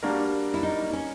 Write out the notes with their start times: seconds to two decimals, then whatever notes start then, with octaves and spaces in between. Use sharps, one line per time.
0.03 G3 A#3 D4 F#4 A#4
0.54 E4
0.63 D#4
0.93 C#4